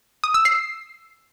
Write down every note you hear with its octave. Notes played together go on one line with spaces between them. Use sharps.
D#6
E6
C7